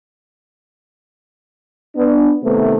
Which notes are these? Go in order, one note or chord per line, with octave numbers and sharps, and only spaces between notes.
B3 D4
C3 D#3 A3 B3